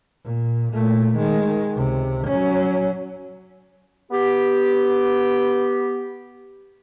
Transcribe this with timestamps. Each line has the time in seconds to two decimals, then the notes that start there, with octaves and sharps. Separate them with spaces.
0.25 A#2
0.73 A#2 A3
1.17 D#3 G#3
1.76 C#2 C3
2.28 F#3 C#4
4.11 B3 G4